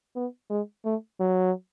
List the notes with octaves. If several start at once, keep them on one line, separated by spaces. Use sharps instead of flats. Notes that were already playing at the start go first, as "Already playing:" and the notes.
B3
G#3
A3
F#3